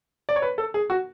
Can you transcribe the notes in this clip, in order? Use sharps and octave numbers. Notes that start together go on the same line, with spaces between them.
D5
C#5
B4
A4
G#4
F#4